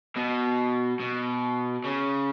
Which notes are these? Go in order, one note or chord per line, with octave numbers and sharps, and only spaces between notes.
B2
B2
C#3